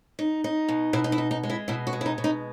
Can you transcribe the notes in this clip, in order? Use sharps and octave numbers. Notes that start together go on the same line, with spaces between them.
D#4
D#4
B2
B2 E4
D#4
E4
D#4
D#4
G#3
E4
B2 E4
F#4
G#3
E4
D#4
B2
D#4